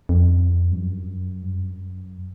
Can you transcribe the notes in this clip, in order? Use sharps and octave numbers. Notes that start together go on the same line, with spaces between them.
F2
G2
F#2
G2
F#2